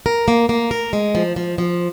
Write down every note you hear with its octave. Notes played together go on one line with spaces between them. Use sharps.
A#4
A#3
A#3
A#4
G#3
F3
F3
F3